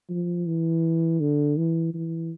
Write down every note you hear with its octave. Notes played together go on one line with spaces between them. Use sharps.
F3
E3
D3
E3
E3